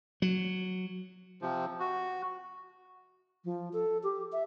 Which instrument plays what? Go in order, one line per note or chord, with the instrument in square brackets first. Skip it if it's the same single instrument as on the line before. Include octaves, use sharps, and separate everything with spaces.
[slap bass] F#3
[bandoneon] C3 F3
F#4
[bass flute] F3
A4
G4
E5